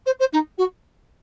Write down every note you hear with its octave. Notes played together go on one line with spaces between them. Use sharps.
C5
C5
D#4
F#4